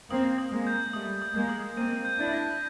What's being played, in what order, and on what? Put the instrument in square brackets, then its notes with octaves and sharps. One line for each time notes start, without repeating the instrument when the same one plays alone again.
[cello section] A#3 C4 [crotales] D#6
[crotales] D#6
[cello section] G#3 A#3
[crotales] G6
[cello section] G3 A3 [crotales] D#6
[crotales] D#6
[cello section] G#3 A#3
[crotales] D#6
[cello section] A#3 C4 [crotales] D#7
[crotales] G6
[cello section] D4 E4
[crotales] A#6